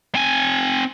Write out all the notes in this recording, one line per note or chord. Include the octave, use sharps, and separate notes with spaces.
C4 G#5